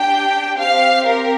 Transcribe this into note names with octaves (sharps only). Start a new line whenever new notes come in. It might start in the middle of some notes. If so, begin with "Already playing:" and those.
Already playing: D4 G4 G5
C4 G4 F5
A#4